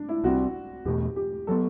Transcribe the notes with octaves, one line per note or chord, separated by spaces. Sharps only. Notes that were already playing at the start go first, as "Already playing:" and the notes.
Already playing: D4
E4
C2 C3 G3 C4 F#4
E2 B2 A3 G4
G4
F#3 B3 A4